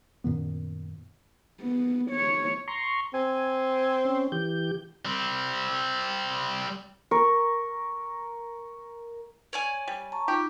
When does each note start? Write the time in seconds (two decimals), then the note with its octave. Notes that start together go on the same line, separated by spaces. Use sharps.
0.24 F#2 A#2 D#3 B3
1.61 B3
2.11 C#5
2.68 A#5 C6 C#6
3.14 C4 G#5
4.05 C#4
4.32 E3 G4 G6
5.05 G3 C4
7.11 A#4 C#6
9.53 C#5 D5 G#5
9.88 G3
10.12 A5 A#5 C#6
10.28 D#4 F4 G4